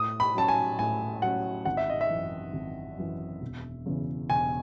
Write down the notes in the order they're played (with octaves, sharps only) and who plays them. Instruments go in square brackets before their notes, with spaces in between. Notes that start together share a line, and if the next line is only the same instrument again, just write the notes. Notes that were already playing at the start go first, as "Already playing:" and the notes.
Already playing: [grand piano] A2 [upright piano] D#6
[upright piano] B5
[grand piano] F#3 C#4 [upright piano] A5
[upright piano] G#5
[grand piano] A2 [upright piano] G#5
[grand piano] F#3 C#4 [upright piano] F#5
[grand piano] G#1 [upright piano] F#5
[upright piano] E5
D#5
E5
[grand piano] F#2 E3
G#1
F#2 E3
E1
E2 C#3 E3
[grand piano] E1 [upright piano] G#5